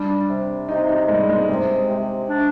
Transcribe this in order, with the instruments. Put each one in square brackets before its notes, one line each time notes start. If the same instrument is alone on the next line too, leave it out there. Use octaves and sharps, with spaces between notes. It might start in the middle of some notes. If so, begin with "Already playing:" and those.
Already playing: [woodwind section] G3 [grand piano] D4
[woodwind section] C3
[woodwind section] C3 [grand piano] D#4
[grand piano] D#4
[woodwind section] G3 [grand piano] G#3
[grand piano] G#3
[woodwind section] C3 [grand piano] G#3
[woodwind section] C3
D4